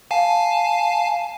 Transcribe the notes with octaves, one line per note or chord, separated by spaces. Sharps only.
F5 G#5 A5